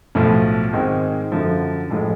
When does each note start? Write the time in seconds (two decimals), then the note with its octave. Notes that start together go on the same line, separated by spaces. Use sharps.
0.15 B1 A2 F3 A3
0.73 G#2 D#3 G#3 C4
1.32 F#2 D3 F3
1.90 A1 A2 F3 G#3